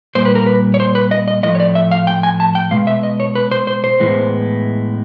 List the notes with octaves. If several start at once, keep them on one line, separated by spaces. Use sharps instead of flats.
A#2 G3 A#3 C5
B4
A#4
B4
C#5
C5
B4
D#5
D#5
A2 F3 A3 D#5
C#5
D5
E5
F5
G5
G#5
A5
G5
B2 G#3 F5
E5
D#5
C#5
B4
C5
C5
C5
A2 E3 G#3 B3